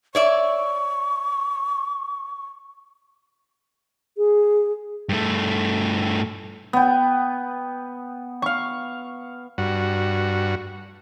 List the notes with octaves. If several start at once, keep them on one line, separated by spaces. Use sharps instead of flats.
C#5 D5 E5 C#6
G#4
G2 A3
B3 G5
F5 C#6
G2 F#4